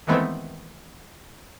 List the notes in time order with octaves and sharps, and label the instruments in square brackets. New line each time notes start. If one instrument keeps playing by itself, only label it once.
[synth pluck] D#3 E3 G#3 A3 B3 C4